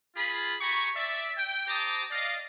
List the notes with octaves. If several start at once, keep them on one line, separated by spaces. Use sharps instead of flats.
F4 G#4 B5
G4 G#5 A#5 B5 C#6
D5 E5
G5
G4 C5 A5 A#5 D6 D#6
D5 D#5 F5